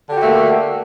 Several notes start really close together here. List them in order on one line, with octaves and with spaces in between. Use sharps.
D3 G4 F#4 A3 A#3